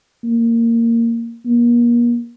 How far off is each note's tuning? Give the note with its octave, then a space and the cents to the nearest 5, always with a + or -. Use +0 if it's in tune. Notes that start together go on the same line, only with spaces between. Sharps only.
A#3 -15
A#3 +35